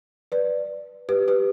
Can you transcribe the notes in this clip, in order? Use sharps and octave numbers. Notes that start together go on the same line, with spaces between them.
B4 D5
G4 B4
G4 B4